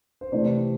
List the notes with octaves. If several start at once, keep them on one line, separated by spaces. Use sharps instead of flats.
C5
C3 E3 A3 D5